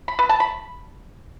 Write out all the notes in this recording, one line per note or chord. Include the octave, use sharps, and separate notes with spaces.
B5
B4
A5
B5